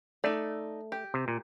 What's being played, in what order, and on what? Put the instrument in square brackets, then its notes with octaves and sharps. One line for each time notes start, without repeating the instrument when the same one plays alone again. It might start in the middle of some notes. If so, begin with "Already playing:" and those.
[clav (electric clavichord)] A3 [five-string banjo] D#4 D5
[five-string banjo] G4
[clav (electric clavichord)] C3
A#2